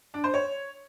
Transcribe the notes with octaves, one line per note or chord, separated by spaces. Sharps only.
D4
C5
C#5